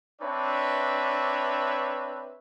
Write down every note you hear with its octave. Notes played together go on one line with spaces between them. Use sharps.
C4 D4 B4 C#5 E5